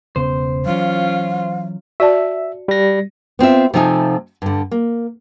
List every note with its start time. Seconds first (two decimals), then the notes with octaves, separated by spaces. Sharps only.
0.16 E1 C#3 B3 C5
0.66 E3 F#3 C#4 F4 F5
2.00 F#4 D5 E5 A5
2.68 G3 A#6
3.39 B3 C4 F4 E5
3.74 C3 F3 A3 D#4 F4 G#5
4.42 G2 D3
4.71 A#3